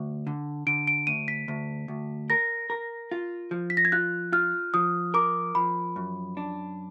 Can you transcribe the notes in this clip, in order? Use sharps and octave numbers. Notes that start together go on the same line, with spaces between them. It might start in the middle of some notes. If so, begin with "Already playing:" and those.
Already playing: D2
D3
D3 D7
D7
D2 D#7
B6
D2
D2
A#4 A#6
A#4
F4
F3
B6
A#6
G#6
F4 F#6
F4 F6
F3 D#6
A#4 D6
F3 B5
F#2
D4